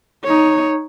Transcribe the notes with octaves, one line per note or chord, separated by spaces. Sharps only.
D#4 C#5